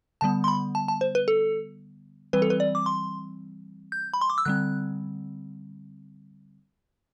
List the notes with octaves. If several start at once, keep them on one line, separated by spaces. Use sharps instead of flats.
D3 G3 B3 A5
C6
B5
A5
A5
C5
B4
A4
E3 G3 C4 B4
A4
B4
D5
D6
C6
G6
B5
C6
D6
E6
D3 G3 C4 F#6